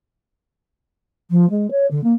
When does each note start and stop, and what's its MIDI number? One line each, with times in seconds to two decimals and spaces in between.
1.31 1.49 53
1.50 1.69 56
1.71 1.86 73
1.91 2.02 50
2.03 2.13 58